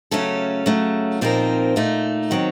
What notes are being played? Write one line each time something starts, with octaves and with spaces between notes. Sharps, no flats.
C#3 F#3 A3 C#4 A4
C#3 F#3 A3
A#2 F3 C4 D#4 A#4
A#2 A3 D#4
D#3 F#3 C4